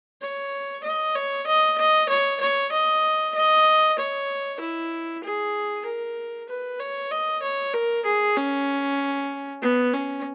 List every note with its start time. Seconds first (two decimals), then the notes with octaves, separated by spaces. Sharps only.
0.22 C#5
0.84 D#5
1.15 C#5
1.47 D#5
1.78 D#5
2.09 C#5
2.41 C#5
2.72 D#5
3.34 D#5
3.98 C#5
4.60 E4
5.24 G#4
5.85 A#4
6.49 B4
6.80 C#5
7.11 D#5
7.42 C#5
7.73 A#4
8.05 G#4
8.37 C#4
9.62 B3
9.93 C#4